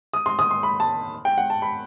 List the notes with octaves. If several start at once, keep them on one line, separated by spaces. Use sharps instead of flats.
D#6
C6
D#6
C6
B5
A5
G5
F#5
A5
B5